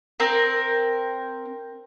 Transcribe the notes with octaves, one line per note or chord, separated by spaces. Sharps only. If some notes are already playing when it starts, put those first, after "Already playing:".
C4 A#4